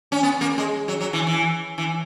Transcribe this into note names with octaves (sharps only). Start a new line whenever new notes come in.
C#4
B3
A#3
G#3
F#3
F#3
E3
E3
E3